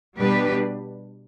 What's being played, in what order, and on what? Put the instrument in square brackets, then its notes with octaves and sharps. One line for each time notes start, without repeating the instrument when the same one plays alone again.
[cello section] B2 G3 D4 G4 B4